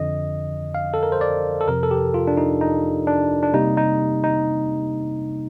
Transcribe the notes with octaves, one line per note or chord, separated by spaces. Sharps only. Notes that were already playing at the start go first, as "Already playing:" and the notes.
Already playing: F2 D3 F3 D#5
F5
A4
A#4
C5
D5
A4
F2 C3 F3 A#4
A4
G4
F4
D4
D#4
D#4
D4
D4
C3 G3 A#3 D#4
D#4
D#4